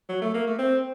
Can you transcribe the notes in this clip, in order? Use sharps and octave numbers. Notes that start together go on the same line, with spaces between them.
F#3
A3
A#3
A3
C4